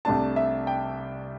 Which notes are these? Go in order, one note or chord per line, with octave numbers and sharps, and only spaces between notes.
C2 C3 A3 D4 A5
E5
G5